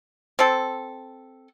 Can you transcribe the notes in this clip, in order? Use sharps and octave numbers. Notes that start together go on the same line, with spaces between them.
C4 A4